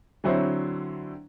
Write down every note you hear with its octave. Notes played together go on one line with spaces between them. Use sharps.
D3 F#3 C4 E4 C5 C#5